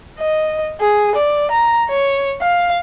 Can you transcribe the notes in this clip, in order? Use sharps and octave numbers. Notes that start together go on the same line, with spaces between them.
D#5
G#4
D5
A#5
C#5
F5